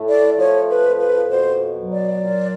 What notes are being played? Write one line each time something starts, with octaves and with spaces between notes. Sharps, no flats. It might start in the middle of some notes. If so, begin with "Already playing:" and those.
Already playing: A2 A3
D5
F3 C#5
B4
F2
B4
B2 C5
F#3
D5
A#2